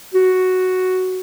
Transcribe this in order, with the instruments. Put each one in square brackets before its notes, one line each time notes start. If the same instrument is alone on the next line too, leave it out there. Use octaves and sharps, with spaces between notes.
[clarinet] F#4